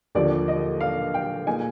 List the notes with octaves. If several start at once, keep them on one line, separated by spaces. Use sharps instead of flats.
D#2 D3 F3 D5
D#5
F5
G5
A#2 G#3 D#4 G#5